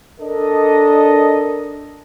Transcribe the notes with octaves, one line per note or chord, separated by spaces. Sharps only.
D4 A4 A#4 D#5